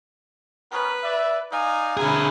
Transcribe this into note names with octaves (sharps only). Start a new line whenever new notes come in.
B3 C#4 A#4 B4
D5 E5
D#4 D5 F5 G#5
D3 B3 E4 G#4 A#4